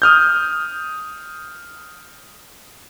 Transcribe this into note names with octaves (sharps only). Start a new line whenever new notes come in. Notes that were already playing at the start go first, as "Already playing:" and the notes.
D#6 F6 G6